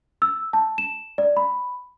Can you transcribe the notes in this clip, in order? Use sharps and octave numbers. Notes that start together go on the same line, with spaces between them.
E6
A5
E7
D5
B5